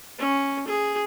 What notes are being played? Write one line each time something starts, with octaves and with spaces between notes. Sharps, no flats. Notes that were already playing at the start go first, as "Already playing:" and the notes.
C#4
G#4